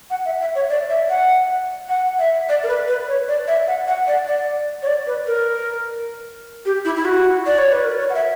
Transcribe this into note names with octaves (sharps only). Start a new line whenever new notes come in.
F#5
E5
E5
C#5
D5
E5
F#5
F#5
E5
D5
A#4
B4
B4
C#5
D5
E5
F#5
F#5
D5
D5
C#5
D5
B4
A#4
G4
E4
E4
F#4
D5
C#5
B4
A#4
C#5
F#5
E5